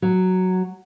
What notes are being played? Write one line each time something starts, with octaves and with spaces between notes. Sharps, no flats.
F#3